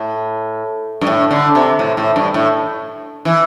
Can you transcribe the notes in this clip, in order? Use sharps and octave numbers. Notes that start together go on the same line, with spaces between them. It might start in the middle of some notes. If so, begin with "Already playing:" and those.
Already playing: A2
G2
A2
D3
C3
A2
A2
G2
A2
E3